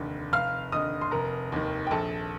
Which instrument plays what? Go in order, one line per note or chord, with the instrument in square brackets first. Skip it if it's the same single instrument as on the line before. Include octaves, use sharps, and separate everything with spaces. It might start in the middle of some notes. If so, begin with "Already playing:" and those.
Already playing: [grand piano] F1 D#2 D3
[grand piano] F1 [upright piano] F5 F6
[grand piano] D#2 D3 [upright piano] D#5 D#6
[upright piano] C6
[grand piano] F1 [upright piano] A#4 A#5
[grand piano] D#2 D#3
[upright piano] G5
[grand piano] A#1 [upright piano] A4 A5